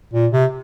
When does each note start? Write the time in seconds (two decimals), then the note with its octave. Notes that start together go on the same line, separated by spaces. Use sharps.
0.13 A#2
0.32 C3